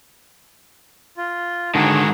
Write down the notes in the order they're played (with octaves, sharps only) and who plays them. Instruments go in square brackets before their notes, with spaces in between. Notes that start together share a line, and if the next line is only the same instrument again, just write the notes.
[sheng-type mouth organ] F4
[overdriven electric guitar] G#2 D#3 [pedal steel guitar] D3 [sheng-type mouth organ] F#4 G#4